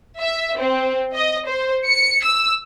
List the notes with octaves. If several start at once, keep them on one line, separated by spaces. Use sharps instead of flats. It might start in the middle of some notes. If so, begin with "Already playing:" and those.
E5
C4
D#5
C5
C#7
E6